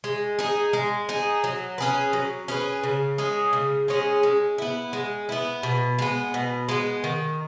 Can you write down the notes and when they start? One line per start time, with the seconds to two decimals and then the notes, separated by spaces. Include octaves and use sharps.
0.04 G#3
0.39 D#4 G#4
0.73 G#3
1.09 D#4 G#4
1.44 F#3
1.78 C#4 G#4 B4
2.13 F#3
2.48 C#4 G#4 B4
2.83 C#3
3.18 G#3 C#4 G#4
3.53 C#3
3.88 G#3 C#4 G#4
4.23 G#3
4.58 B3 E4
4.93 G#3
5.29 B3 E4
5.63 B2
5.99 G#3 B3
6.34 B2
6.69 G#3 B3
7.04 D#3